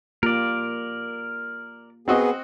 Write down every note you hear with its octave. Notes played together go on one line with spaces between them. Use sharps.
A#3 F4 G4 A#4 D5
B3 C4 F#4 G#4 D#5